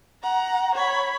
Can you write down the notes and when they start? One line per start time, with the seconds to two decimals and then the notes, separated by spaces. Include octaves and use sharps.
0.23 F#5 A#5
0.75 C#5 B5